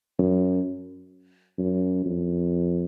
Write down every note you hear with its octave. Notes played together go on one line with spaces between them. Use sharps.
F#2
F#2
F2